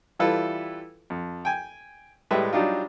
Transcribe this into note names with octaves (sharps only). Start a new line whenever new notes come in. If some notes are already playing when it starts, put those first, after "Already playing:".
E3 G3 E4 F4 A4 B4
F2
G5 G#5
A2 G3 G#3 G4 B4 E5
F#3 G3 D4 D#4 F4